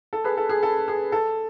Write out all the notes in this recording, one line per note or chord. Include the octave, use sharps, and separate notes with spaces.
A4
G#4 B4
A4
G#4
A4
G#4
A4